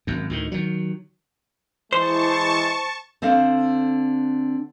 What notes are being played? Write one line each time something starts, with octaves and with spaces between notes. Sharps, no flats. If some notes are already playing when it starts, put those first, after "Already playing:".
G#1 F#2
D2 A2 D#3
D#3 F#3
E3 G#3 C5 A5 C#6
D3 C4 A4 F5